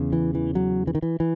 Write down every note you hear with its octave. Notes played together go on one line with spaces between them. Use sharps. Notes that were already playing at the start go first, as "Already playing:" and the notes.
Already playing: E2 C#3
E3
E3
F#3
E3
D#3
E3
E3